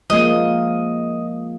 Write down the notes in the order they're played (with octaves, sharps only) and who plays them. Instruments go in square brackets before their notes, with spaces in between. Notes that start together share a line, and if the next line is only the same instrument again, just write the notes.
[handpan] F3 G#3 A#3 [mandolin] D#5